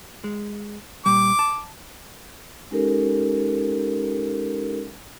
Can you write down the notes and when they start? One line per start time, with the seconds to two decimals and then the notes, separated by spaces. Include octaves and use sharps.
0.24 G#3
1.06 A#2 G3 D6
1.39 A5
2.71 G#3 C#4 D#4 G4 A4 A#4